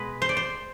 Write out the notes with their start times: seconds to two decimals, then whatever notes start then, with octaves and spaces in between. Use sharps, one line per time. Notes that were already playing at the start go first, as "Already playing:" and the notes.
Already playing: B2 G#3 B4
0.22 C5
0.29 D5
0.37 C5